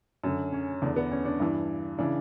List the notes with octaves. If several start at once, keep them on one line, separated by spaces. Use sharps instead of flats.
F#2 D3
C#4
E2 D3 D4
B3
C#4
D4
G2 E3
C#3 E3 D4